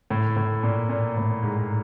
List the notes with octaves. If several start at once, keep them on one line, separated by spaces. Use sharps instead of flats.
A2
A2
A#2
A#2
A2
G#2